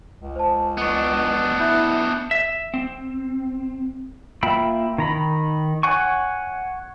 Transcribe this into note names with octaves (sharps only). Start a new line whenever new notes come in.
C#2
C5 A5
B3 D4 D#5 C#6
E4 E5 F#6 G6
E5
C4
A#3 F4 E5 G5 B5
D#3 A#5 B5
C#5 F#5 G#5 C#6